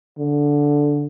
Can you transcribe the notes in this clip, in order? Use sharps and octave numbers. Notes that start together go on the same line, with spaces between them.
D3